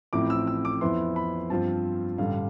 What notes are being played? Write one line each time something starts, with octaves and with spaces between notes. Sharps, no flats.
A1 A2 F3 C4 E4 D6
E6
E6
D6
F2 E3 B3 E4 C6
B5
G2 F3 C4 F4 A5
A1 G2 D3 G3 F5